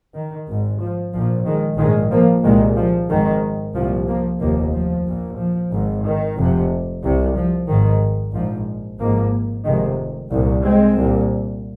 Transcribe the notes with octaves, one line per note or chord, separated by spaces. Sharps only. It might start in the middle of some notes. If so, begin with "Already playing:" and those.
D#3
G#1 G#2
F3
A#1 A#2 F3
D#3 G#3
A#1 G#2 D#3 G#3
F3 A#3
C2 A#2 D#3 G#3
F3
G#1 G#2 D#3
C2 A#2 F3
F3 A#3
F1 D#2 F3 A#3
F3
A#1 A#2
F3
G#1 G#2
D#3
F1 F2 C3
C2 C3
F3
G#1 G#2 D#3
A#1 G#2 F3
G#1 G#2 F3 A#3
F1 F2 C3 D#3 G#3
C2 A#2
G#3 C4
C2 A#2